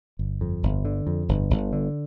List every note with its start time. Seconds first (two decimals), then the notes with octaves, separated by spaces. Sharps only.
0.19 G1
0.41 F2
0.63 G1
0.85 D3
1.07 F2
1.29 G1
1.50 G1
1.73 D3